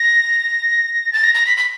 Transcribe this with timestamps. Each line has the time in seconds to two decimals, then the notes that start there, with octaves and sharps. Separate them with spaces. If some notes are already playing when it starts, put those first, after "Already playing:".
Already playing: A#6
1.13 A6
1.24 A#6
1.35 A#6
1.46 B6
1.57 B6